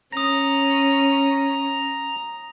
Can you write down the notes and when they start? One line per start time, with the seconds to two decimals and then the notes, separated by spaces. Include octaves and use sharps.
0.12 C#4 A#5 D#6 A#6